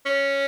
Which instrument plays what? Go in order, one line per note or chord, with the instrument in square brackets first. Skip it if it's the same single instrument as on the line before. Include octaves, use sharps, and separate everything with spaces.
[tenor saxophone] C#4